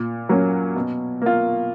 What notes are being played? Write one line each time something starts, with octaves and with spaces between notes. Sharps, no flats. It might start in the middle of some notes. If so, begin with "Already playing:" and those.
Already playing: A#2
F#3 A#3 C#4
B2
A#3 F4